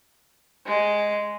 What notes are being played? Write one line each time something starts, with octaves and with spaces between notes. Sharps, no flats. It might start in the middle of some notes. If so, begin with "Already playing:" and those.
G#3